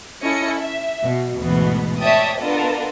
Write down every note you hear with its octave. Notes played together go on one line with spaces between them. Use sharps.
C#4 E4 A4 D#5 C#7
E5
B2
D2 G#2 B2 E3 B3
C#5 D5 E5 G5 A5 D#6
B3 D4 F4 A4 A#4 D#5